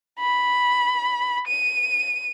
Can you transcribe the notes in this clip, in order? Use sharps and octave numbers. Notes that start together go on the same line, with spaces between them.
B5
D#7